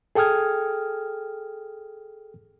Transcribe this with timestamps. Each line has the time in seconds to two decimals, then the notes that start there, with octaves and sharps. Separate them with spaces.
0.15 G#4 A4 G5 D#6 F6 G#6